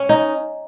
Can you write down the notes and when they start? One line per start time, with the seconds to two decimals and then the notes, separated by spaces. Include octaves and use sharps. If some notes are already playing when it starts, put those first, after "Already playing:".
Already playing: C#4
0.09 D#4